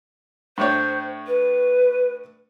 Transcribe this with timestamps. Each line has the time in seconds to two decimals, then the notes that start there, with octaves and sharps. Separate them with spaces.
0.58 A2 D4 C5 C#5
1.27 B4